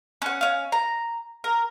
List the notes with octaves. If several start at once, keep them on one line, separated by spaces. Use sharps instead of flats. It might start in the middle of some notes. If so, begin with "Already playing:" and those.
C#4 F#5
C#4 F5
A#5
A#4